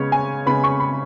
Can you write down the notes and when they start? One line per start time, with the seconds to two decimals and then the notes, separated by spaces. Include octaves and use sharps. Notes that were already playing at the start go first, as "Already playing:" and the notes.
Already playing: C#3 G#3 B3 C#5
0.12 G#5
0.46 C#3 G#3 B3 B5
0.64 C#6
0.80 B5